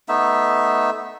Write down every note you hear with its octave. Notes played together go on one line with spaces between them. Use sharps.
A3 B3 D#4 E5